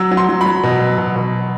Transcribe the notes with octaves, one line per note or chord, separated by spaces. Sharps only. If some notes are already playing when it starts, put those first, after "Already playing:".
Already playing: F#3 E6
F#3
C6
F#3
B5
F#3
B2
F#3
B2
B2